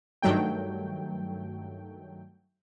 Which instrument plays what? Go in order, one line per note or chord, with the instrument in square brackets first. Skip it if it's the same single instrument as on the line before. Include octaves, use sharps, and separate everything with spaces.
[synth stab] G2 D#3 F#3 A3 G5